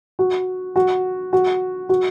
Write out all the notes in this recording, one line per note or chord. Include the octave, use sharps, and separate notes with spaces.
F#4
F#4
F#4
F#4